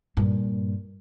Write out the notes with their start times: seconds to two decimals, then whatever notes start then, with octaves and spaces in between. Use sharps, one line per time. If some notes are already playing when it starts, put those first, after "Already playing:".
0.17 G2 A#2